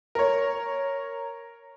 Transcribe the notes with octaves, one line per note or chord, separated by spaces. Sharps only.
A#4 C#5